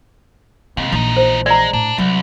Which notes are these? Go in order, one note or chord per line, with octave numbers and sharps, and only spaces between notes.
D#2 G#2 C3
A#1 E3 F3 D#4
C5
G#3 D5 A#5
A2 D4
C2 F#3